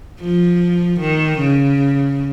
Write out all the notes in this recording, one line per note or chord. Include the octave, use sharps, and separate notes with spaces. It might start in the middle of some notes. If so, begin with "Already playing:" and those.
F3
D#3
C#3